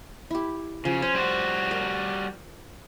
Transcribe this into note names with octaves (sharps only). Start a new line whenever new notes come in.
E4 G4
C#3 F3
C#4 C5
G3 F#4
A#4